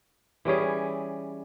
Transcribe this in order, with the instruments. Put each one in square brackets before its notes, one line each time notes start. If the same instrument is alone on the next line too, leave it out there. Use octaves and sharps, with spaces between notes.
[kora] E3 G3 C#4 G#4